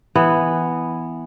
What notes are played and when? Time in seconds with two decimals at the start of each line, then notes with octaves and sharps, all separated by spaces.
0.15 E3 B3